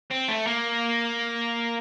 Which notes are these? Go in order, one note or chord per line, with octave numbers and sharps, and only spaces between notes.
C4
A3
A#3